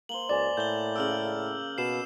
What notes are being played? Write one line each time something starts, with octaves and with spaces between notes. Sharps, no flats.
A#3 C5 F#7 G7
C#2 D5 G#5 D6
A2 G6 G7
C#3 A#5 D6 E6 F6 F#7
B2 C7 E7